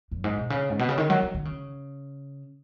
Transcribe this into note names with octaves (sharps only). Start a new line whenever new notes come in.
F#2
G#2
B2
C#3
G#2
B2
C#3
D#3
F#3
F#3
D#3
C#3